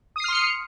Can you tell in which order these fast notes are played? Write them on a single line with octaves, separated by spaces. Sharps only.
D#6 C7 F6 C6 C#7